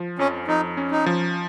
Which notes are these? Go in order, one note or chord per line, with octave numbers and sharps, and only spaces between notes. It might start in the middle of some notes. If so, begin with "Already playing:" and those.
Already playing: F3
F2 C#4
F2 D#4
C#4
D#4
F3